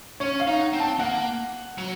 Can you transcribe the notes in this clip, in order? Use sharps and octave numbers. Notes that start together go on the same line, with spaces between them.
C#4 C#5
F5
D#4
F#5
C4
A5
A#3 F#5
F#3